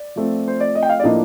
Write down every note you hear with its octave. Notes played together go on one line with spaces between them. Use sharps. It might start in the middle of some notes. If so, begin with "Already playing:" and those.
Already playing: D5
F3 A3 C4 F4
C5
D5
D#5
G5
F5
D5
A2 F3 A#3 D4 D#5